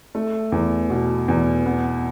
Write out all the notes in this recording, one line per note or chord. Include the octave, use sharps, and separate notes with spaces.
A3
E2
B2
E2
B3